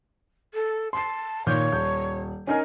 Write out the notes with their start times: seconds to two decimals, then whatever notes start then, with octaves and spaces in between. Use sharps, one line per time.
0.54 A4
0.93 A5 C6 C7
1.47 A#2 D#3 C#5 G6
1.72 D#1 G6
2.47 C#4 D#4 A#4 G#5